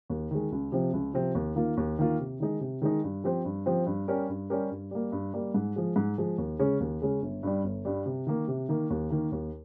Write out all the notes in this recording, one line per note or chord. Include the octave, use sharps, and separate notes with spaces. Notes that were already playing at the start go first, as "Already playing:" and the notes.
D#2
D#3 G#3
C#2
C3 F3 C4
C#2
C3 F3 C4
D#2
D#3 A#3 F4
D#2
D#3 A#3 F4
C3
D#3 G#3 D#4
C3
D#3 G#3 D#4
G2
F3 C4 G4 C5
G2
F3 C4 G4 C5
G2
G3 C#4 G4 A#4
G2
G3 C#4 G4 A#4
G2
G3 A#3
G2
G3 A#3
G#2
F3 G#3
G#2
F3 G#3
D#2
C#3 G#3 C#4
D#2
C#3 G#3 C#4
G1
G2 G3
G1
G2 G3
C3
D#3 A#3
C3
D#3 A#3
D#2
D#3 A#3
D#2